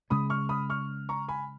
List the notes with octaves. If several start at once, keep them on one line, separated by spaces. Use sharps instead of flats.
C#3 G#3 C#4 B5 D#6
C#6 F6
B5 D#6
C#6 F6
A#5 C#6
G#5 B5